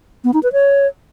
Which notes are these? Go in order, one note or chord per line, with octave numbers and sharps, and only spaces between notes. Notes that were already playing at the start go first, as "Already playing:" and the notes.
B3
D#4
B4
C#5